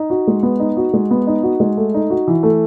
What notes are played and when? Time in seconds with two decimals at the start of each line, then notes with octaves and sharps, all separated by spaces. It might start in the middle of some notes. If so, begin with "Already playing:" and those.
Already playing: D#4
0.10 F#4
0.27 G#3
0.43 B3
0.60 D#4
0.77 F#4
0.94 G#3
1.11 B3
1.27 D#4
1.43 F#4
1.60 G#3
1.77 A3
1.94 D#4
2.10 F#4
2.28 E3
2.43 A3